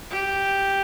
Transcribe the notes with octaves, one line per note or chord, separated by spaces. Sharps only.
G4